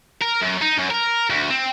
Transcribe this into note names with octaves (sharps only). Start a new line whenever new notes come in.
A#4
F#2
D#4
F#2
A#4
D2
C4